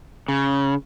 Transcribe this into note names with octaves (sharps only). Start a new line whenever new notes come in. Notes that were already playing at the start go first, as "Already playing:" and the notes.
C#3